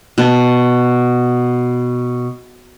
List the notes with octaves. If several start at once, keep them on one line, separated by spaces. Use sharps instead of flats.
B2 A5